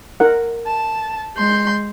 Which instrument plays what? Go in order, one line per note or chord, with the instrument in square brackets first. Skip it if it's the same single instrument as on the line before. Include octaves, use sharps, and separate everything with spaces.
[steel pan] D#4 A#4 F#5
[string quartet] A5
G#3 C6 G6